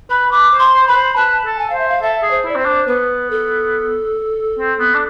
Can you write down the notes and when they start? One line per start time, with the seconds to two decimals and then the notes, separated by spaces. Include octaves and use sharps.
0.10 B4 B5
0.31 B4 D6
0.53 C5
0.59 C6
0.74 C5
0.87 B4 B5
0.96 C5
1.16 B4 A5
1.45 A4
1.59 G#5
1.70 C5 F5
1.78 E5
1.89 F5
2.02 A4 E5
2.23 G#4
2.31 C5
2.45 E4 D5
2.55 C4 C5
2.66 D4
2.87 B3 B4
3.30 A4
4.59 C4
4.80 B3
4.95 D4